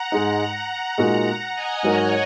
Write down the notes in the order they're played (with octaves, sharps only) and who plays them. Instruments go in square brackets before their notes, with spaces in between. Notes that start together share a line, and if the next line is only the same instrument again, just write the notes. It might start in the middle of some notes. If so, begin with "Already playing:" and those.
Already playing: [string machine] F#5 A#5
[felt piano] G#2 G#3 D#4
[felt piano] A#2 G#3 D#4 F#4 A#4 [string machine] F#5 A#5
[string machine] F#5 A#5
D#5 G#5
[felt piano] G#2 F#3 D#4 A#4 [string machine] C#5 F#5